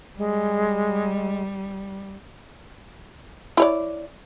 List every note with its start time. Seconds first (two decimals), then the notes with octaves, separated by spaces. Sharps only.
0.17 G3 G#3
3.57 E4 C#5 D5